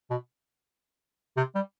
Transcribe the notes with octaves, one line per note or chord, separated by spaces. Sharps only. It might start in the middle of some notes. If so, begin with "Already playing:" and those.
B2
C3
G3